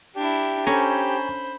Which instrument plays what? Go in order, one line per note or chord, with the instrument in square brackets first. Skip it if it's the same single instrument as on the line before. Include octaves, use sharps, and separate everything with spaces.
[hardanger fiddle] D4 E4 [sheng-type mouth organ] G4
[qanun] C#4 D4 A4 [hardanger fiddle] C5 B5 [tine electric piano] G#5 A#5 C#6